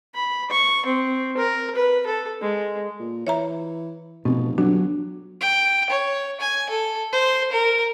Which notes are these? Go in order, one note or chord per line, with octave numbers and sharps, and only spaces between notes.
B5
C#6
C4
A#4
B4
A4
G#3
A#2
E3 C#5 E5 A#5
F1 B2 C4
G1 F#3 D4
G5
C#5
G#5
A4
C5
A#4